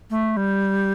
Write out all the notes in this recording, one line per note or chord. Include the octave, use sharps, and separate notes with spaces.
A3
G3